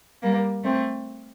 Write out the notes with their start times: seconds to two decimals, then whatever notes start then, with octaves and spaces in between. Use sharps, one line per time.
0.22 G3 A#3
0.64 A3 C4